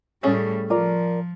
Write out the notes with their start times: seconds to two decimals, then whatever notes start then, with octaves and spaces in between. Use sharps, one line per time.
0.23 A2 G3 A3 C#4 G#4
0.70 F3 F4 A#4 D5